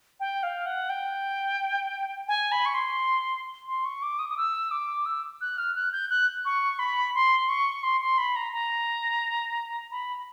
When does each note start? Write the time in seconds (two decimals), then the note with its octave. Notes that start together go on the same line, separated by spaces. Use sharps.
0.20 G5
0.43 F5
0.66 F#5
0.90 G5
2.28 G#5
2.52 B5
2.66 C#6
2.74 C6
3.67 C6
3.85 C#6
4.03 D6
4.19 D#6
4.30 D#6
4.37 E6
4.71 D6
5.06 E6
5.41 F#6
5.58 F6
5.76 F#6
5.92 G6
6.10 F#6
6.45 C#6
6.79 B5
7.15 C6
7.49 C#6
7.83 C6
8.01 C6
8.18 B5
8.36 A#5
8.53 A#5
9.92 B5